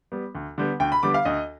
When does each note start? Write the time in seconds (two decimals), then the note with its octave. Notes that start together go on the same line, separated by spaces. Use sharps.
0.12 G3 B3
0.35 D2
0.58 D3 G3 B3
0.80 D2 G5
0.92 B5
1.03 D3 G3 B3 D6
1.14 F5
1.25 D2 D#5